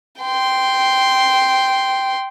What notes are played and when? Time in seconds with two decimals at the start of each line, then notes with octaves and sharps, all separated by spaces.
0.21 G5 C6